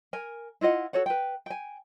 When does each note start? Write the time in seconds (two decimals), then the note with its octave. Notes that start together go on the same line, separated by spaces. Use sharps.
0.13 A#4 G#5
0.61 E4 F4 D#5 F#5
0.93 F#4 A4 C#5 F#5
1.06 B4 G5
1.46 G5 G#5